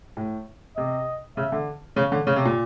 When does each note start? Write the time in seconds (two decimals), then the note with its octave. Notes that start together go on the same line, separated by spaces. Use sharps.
0.17 A2
0.77 C3 D#5
1.37 C#3 E5
1.52 D3
1.96 C#3 C#5
2.12 D3
2.26 C#3 C#5
2.36 C3
2.46 A#2